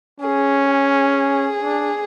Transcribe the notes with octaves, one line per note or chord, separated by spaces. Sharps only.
C#4 G#4
G#4
D4